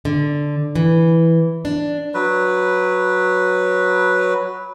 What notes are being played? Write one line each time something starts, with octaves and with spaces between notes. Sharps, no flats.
D3
E3
D4
F#3 B4